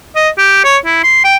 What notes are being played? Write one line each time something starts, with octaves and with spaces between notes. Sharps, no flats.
D#5
G4
C#5
E4
C6
G5